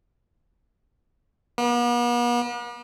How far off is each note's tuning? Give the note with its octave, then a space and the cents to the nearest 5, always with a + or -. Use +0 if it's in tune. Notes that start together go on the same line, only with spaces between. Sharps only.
B3 -45